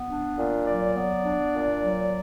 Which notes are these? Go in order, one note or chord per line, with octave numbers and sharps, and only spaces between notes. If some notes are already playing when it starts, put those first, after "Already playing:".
Already playing: B3
D4
A#2
F#3 D5
B3
D4
A#2
F#3